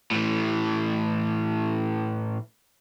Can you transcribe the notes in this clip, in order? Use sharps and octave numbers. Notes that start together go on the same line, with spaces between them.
A2 E3